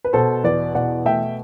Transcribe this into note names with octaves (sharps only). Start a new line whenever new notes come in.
B4
B2 A4 C5
E2 B4 D5
B2 D5 F#5
A3 E5 G5